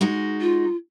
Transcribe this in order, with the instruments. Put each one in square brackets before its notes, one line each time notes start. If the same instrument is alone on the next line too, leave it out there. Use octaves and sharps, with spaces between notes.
[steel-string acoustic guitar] G#3 D#4 F#4
[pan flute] F4